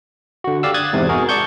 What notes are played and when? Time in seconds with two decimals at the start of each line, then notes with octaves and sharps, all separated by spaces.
0.44 D3 F#4
0.63 G4 D5 F5 E6
0.74 D#6 F#6 G#6 A6
0.93 E2 G#2 C3
1.09 F#4 G#4 A#4
1.29 D5 A5 C#6 G6